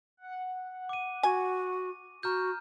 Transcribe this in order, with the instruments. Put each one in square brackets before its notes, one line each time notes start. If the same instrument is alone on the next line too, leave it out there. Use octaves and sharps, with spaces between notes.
[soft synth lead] F#5
[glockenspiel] D6 D#7
[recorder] F#4 [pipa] G#5
[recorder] F#4 [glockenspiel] A#5 F6 G6